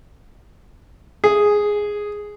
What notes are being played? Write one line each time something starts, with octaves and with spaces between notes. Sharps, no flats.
G#4